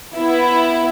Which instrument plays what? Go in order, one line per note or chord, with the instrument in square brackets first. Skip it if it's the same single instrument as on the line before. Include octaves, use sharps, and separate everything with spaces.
[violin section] B3 E4